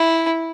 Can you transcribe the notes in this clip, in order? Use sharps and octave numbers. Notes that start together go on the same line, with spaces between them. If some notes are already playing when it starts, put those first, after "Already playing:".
Already playing: E4